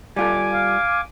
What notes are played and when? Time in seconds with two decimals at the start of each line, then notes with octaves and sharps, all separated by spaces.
0.16 G3 F4 A4 G#5 D6
0.53 F5